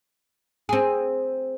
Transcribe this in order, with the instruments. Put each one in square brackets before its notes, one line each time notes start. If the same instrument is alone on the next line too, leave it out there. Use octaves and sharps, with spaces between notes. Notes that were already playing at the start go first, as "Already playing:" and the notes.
[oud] C4 G#4